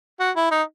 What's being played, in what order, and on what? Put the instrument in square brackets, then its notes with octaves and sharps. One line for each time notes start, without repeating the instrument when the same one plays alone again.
[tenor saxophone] F#4
E4
D#4